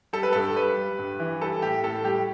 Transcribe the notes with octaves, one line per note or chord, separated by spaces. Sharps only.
G3 A4
B4
G2 A4
G3 B4
G3
G2
E3
G3 A4
A2 G4
A2 A4
G3 G4